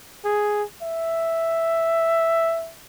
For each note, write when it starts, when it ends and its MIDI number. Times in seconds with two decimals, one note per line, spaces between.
0.25 0.64 68
0.82 2.71 76